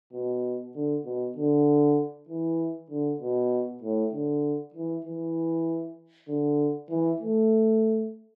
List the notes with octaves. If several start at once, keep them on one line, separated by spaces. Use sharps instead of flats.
B2
D3
B2
D3
E3
D3
B2
A2
D3
E3
E3
D3
E3
A3